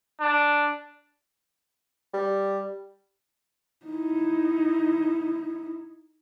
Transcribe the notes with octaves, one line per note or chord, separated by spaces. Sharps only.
D4
G3
D#4 E4